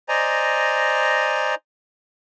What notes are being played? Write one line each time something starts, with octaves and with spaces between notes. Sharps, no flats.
C5 D5 D#5 G#5 A#5